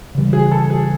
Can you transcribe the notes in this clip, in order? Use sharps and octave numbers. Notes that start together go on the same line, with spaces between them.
C#3 E3 G3
G#4
A4
G#4